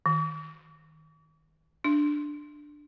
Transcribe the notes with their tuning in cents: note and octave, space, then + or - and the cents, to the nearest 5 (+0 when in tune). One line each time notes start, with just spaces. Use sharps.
D#3 +10
D4 +10